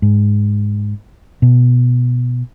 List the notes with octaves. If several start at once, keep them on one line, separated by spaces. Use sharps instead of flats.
G#2
B2